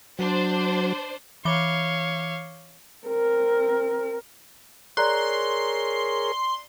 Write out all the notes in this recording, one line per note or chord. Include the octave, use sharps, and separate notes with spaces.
F#3 D4 C5
E3 C#5 F5 D6 G7
C4 A#4
G#4 A#4 C#5 D5 A#5 C6 F#6